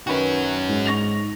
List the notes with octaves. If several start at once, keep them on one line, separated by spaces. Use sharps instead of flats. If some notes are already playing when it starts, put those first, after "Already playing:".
D#3 C#4 F#4 B4
G#2
C#6 A#6 F7